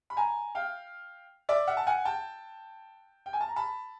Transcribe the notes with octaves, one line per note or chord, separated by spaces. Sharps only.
B5
G#5 A#5
F5 G5
D5 E5
E5 F#5
A5
F#5 G#5
G5 A5
G5
G#5
A5
A#5
A5 B5